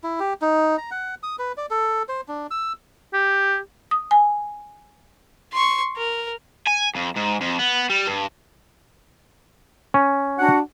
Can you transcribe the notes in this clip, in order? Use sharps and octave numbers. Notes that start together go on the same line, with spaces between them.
E4
G4
D#4
A#5
F#5
D#6
B4
D5
A4
C5
D4
E6
G4
D#6
G#5
C6 C#6
A#4
G#5
F2
G#2
F2
B3
G3
G2
C#4
D4 F#4 F#5